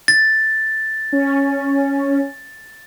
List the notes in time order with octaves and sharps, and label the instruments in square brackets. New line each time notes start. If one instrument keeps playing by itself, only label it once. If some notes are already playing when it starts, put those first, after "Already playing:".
[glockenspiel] A6
[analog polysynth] C#4